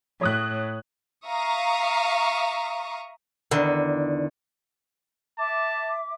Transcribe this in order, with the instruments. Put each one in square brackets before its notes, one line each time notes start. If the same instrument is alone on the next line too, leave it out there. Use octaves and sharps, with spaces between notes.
[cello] A2 [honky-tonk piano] C#5 D#6 F#6
[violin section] E5 F5 A#5 C#6 D#6
[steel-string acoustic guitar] E2 D3 D#3
[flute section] E5 D6 [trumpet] A5